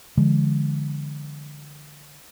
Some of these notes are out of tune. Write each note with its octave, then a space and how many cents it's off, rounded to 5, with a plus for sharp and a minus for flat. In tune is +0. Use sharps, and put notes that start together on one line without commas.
D3 +0 F3 -45 G#3 +0